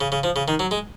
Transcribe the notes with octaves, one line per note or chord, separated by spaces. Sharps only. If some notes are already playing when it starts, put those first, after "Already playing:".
C#3
C#3
F3
C#3
D#3
F#3
G#3